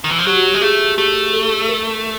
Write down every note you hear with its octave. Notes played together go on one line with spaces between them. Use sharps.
D#3
E3
F3
F#3 G4
F#4
G4
G#3
A3 G#4
A3 G4
A4
A#4